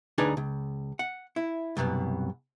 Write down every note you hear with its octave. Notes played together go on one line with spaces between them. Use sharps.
D2 D4 D#4 G#4 B4 G#5
C#2
F#5
E4
C2 F#2 B2 B3